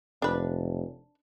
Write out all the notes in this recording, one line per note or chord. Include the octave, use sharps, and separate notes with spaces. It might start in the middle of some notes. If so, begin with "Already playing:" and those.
F1 D4 B4